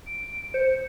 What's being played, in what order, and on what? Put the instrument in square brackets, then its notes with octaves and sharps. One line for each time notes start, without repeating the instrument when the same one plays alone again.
[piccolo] D7
[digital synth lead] C5 [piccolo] C#7